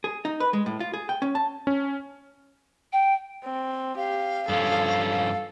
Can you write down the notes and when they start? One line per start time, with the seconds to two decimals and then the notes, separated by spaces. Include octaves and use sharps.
0.04 G#4
0.25 D#4
0.40 B4
0.53 G#3
0.66 A2
0.80 F4
0.94 G#4
1.09 G5
1.22 C#4
1.35 A5
1.67 C#4
2.93 G5
3.44 C4
3.97 G4 F5
4.49 G2 F3 C#4 A4